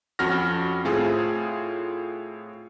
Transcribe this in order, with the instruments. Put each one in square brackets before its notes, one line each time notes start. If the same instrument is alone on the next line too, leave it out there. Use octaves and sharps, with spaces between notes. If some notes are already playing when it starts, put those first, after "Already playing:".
[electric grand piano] F2 C#4 F#4 F6 A#6
A2 C4 F4 G#4